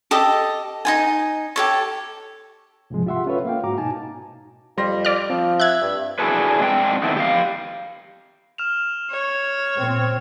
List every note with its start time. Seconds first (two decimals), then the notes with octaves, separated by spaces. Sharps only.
0.11 G4 A4 D#5
0.85 D#4 F4 G#5
1.56 G4 A4 C#5
2.90 C#2 G#2 C3 F3 G#3
3.06 F4 G4 E5 F#5 C6
3.26 C#4 F4 A4 B4 C#5 E5
3.45 A#3 F5 G5
3.63 G#2 F#4 A#5 D6
3.78 B2 D#4 G#5 A5
4.78 F2 G3 C6 A#6
5.05 D5 F6
5.29 F3 C4
5.60 E5 F#6 G#6
5.82 G2
6.19 D4 E4 F#4 G#4 A4 B4
6.60 G#3 C4 D4 F5 G5
7.03 D#3 A3 B3 C4 D4 E4
7.16 G4 F5
8.58 F6 E7 F7
9.11 C#5
9.77 A#2 C4